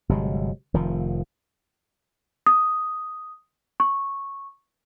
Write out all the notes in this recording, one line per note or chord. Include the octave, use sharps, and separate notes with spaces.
G1 C3 F#3 G#3
F1 D#3 F3
D#6
C#6